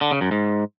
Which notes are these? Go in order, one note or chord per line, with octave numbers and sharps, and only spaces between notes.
D3
C#3
F#2
G#2